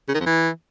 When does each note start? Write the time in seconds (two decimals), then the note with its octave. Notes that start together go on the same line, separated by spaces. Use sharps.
0.08 C#3
0.14 D#3
0.20 F2
0.26 E3